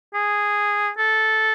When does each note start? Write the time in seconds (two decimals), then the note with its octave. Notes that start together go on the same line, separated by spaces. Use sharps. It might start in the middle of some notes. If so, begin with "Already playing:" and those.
0.14 G#4
0.98 A4